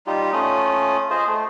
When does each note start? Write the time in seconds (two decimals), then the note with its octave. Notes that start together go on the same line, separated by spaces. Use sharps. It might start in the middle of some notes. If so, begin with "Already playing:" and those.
0.07 G3 D#4 F4 G4
0.33 A3 C#4 F4 D#6
1.10 F4 G#4 C5 D#5
1.27 A3